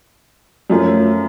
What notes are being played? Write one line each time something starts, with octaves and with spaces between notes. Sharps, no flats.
F#2 F3 A3